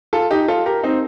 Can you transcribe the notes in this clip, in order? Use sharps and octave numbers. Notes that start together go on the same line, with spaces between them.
F4 A4
D#4 G4
F4 A4
G4 A#4
C4 D#4